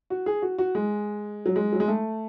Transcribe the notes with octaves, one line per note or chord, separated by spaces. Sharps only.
F#4
G#4
F#4
F#4
G#3
F#3
G#3
F#3
G#3
A3